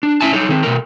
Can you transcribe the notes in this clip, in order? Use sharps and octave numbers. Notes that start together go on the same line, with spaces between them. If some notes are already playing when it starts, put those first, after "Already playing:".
D4
C#4 E4 E5 G#5 A5
D#4 A4 C#5
D#3 C4
B2 A3 A#4